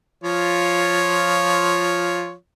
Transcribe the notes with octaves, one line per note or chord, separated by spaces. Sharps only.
F3 F4 C#5